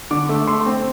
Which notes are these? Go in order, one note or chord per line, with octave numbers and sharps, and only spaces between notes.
D3 D6
A3
A3 C6
C4